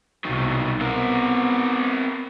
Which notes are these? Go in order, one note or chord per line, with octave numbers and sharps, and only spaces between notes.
C2 B2 D#3 F#3
B3 C4 A#4